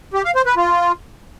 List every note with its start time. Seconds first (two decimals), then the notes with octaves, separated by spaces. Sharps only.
0.14 G4
0.24 F5
0.35 C5
0.46 B4
0.57 F4